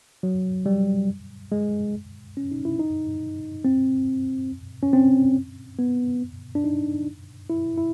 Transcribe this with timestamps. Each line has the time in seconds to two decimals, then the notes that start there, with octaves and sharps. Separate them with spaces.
0.23 F#3
0.66 G3
1.52 G#3
2.37 C#4
2.51 D#4
2.65 E4
2.79 D#4
3.65 C4
4.83 C#4
4.93 C4
5.79 B3
6.55 D4
6.64 D#4
7.50 E4
7.78 E4